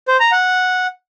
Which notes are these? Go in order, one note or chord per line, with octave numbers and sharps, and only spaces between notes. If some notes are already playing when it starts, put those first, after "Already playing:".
C5
A#5
F#5